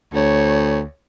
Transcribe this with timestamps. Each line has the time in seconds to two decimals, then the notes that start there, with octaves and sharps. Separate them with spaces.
0.14 D2 C#5